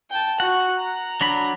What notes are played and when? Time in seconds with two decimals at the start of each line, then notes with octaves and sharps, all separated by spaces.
0.10 G5 A5
0.40 F#4 F#5
0.78 A#5
1.21 F#3 D4 B5